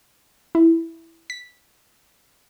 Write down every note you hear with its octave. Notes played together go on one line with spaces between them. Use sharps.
E4
B6